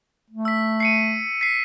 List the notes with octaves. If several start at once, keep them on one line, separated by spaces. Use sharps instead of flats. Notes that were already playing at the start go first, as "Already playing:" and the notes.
A3
E6 B6
C7 C#7 D#7
B6 C7